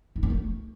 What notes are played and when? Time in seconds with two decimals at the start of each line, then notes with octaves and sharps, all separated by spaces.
0.16 E4
0.23 C#4
0.30 A3